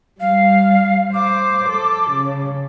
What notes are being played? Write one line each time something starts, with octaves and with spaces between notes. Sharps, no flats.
G3 F5
C5 D6
A4
C#3